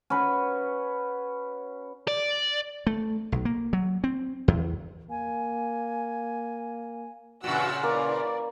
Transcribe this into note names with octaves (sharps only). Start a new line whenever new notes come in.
C#4 F#4 B4
D5
A3
B1
A#3
F#3
C4
E2
A#3 G#5
G2 A#2 C#3 E3 F#4 F#5 G5 E6
E3 A#3 C#4 D5